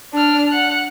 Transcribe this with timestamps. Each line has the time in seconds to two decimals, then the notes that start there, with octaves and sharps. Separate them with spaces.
0.13 D4 F6
0.51 F#5 F#6